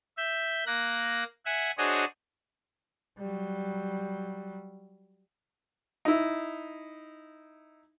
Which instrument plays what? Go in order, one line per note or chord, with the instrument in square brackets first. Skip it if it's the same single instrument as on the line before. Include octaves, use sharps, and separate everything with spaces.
[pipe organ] E5 G6
A#3 F#6 A#6
E5 F#5 G#5
D4 F#4 G#4 C5 C#5 D#5
[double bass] F#3 G3
[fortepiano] D#4 E4